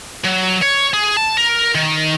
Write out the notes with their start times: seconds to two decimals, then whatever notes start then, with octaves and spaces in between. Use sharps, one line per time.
0.25 F#3
0.63 C#5
0.94 G#4
1.17 A5
1.37 A#4
1.75 D#3